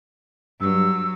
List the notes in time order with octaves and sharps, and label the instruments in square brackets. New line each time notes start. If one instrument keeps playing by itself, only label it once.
[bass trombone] G2 [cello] F#3 [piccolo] E6